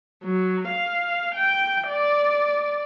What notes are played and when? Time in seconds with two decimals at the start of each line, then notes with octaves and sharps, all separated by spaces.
0.25 F#3
0.68 F5
1.33 G5
1.87 D5